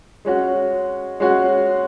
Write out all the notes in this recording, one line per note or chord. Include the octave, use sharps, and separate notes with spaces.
G#3 C#4 F#4
G#3 C#4 F#4